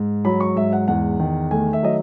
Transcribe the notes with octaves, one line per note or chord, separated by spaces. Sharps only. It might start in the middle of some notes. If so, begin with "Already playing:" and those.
Already playing: G#2
F#3 B5
C#6
G#2 E5
F#5
E2 F#5
D#3
A3 G#5
E5
F#3 D#5